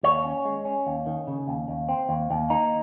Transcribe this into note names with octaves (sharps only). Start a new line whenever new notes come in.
D#2 C#5
C#4
G#3
C#4
D#2
D#3
C#3
D#2
D#2
C4
D#2
D#2
A#3 D#4